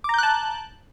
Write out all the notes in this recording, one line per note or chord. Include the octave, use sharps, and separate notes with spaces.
A5 A#5 D6 F#6 G6